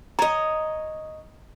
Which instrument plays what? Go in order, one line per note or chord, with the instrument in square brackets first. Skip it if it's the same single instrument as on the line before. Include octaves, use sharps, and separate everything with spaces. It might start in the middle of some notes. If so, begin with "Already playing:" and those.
[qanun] C#5 D#5 [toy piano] A#5